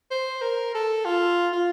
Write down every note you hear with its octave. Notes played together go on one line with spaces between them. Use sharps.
C5
A#4
A4
F4
F4